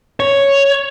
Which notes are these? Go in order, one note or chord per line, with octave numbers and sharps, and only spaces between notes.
C#5